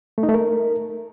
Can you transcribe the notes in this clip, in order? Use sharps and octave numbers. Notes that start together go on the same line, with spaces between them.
A3
D#4
A3
A#4